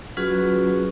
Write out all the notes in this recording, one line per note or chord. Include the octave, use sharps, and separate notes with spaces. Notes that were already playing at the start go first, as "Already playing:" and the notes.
F#3 C#4 F4 F#4 G#4 B4